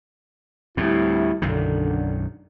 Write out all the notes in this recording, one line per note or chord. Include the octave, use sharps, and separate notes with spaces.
D2 A2 G3 C4 E4
B1 F#2 D3 D#3